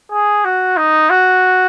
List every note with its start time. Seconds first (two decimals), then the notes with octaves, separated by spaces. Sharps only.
0.11 G#4
0.45 F#4
0.77 D#4
1.10 F#4